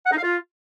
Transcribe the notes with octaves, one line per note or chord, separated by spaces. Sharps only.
F#5
D#4
F5
F4